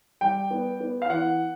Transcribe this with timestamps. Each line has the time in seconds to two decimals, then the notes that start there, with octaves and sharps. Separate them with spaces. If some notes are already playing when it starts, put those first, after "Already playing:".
0.21 G3 G5
0.51 B3
0.80 B3
1.02 F5
1.09 E3 F#5